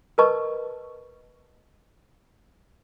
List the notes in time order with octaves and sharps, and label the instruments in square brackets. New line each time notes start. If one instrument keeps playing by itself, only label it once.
[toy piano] A#4 B4 D#5 A5 C#6